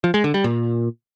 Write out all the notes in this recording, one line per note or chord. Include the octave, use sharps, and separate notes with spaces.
F3
G#3
D3
G3
A#2